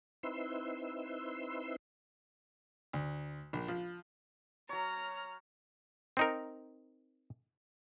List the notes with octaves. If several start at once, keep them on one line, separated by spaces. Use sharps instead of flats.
C4 D#4 E4 B4 C6 E6
D2
A#1
F3
F#3 C#5 A#5 F6
C4 D#4 A#4